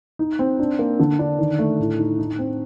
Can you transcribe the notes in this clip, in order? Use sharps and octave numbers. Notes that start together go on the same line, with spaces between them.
D#4
C4
D4
A#3
D3
D4
D#3
A3
A2
D#4
D#4
C4